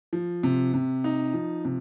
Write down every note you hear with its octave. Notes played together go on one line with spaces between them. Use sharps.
F3
C3
C3
D#4
F3
C3